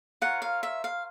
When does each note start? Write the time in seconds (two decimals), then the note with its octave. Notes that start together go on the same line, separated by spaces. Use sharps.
0.22 F4 A#4 C#5 F#5
0.42 F5
0.63 E5
0.84 F5